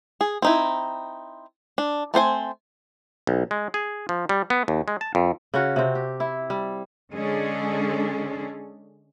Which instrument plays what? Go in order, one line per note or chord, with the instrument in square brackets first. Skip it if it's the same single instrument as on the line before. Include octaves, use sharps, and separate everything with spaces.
[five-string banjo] G#4
C4 D#4 E4
D4
A3 C4 C5 G#5
[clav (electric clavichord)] B1
G#3
G#4
F3
G3
B3
D#2
G#3
A5
F2
[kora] C#3 C#4 F#4
C3 C4
G4
E4
G3
[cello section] D3 G#3 C#4 D4 G#4 A4